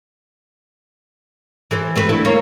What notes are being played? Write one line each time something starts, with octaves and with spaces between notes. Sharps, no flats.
E3 A4 C5
A3 C4 B4
D2 E4 A4
A#3 C#5